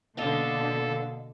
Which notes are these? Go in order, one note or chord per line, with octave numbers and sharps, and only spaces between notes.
B2 D3 A#3 A4 D#5 F5